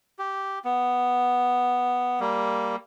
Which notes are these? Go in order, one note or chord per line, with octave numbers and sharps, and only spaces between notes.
G4
B3
G3 A#3